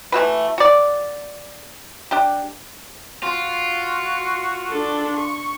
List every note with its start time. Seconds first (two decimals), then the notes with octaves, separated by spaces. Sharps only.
0.12 E3 A3 F#4 B4
0.58 F#4 D5
2.11 D4 G4
3.23 F4 F#4
4.70 D4 A4
5.17 C#6